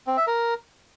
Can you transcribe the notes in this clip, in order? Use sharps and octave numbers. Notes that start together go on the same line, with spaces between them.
C4
E5
A#4